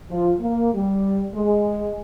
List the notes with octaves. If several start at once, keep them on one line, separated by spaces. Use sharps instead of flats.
F3
A#3
G3
G#3